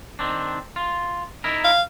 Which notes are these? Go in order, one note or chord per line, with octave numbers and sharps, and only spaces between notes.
D#3 C4 D4
F4
D#4 E4 A#4
F5